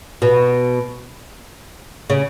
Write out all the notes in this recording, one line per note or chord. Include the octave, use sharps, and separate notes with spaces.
B2
C#3